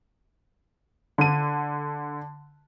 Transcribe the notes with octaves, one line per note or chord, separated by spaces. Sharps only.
D3 D#7